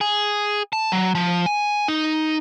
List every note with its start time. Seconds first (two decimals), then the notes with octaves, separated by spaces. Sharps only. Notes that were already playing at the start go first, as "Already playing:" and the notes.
0.01 G#4
0.73 A5
0.92 F#3
1.15 F3
1.46 G#5
1.88 D#4